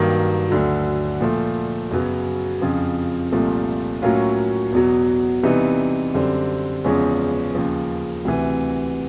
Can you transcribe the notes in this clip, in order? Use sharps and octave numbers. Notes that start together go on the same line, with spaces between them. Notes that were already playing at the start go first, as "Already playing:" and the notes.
Already playing: G2 D#3 F#3 A#3
D2 D3 F#3
A#2 F3 A3
F#2 C#3 F#3 B3
F2 C#3 F3
C2 A#2 F3 A3
A2 F#3 A#3 C#4 F4
E2 B2 F#3
C3 E3 G3 B3 D#4
F#2 D3 G3 C4
E2 C#3 F3 G#3 C#4
D#2 C#3 F3
D2 C3 E3